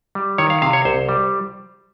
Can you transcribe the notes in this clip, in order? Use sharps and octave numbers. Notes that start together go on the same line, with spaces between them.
G3
D#3 C#5
F5
C3 F5
C#5
C2 C5
G3